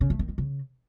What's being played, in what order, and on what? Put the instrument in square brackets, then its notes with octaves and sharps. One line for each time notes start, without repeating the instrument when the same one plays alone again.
[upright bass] C#3
A3
D#3
G#3
C#3